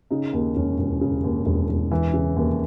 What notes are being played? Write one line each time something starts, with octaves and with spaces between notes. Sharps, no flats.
C#3 D#4
D#2
E1 C#4
E1
C#3
D#2
E1
E1
E3
C#3
D#2